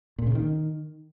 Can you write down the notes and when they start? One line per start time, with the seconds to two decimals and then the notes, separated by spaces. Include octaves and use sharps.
0.18 A#2
0.27 C#3
0.35 D#3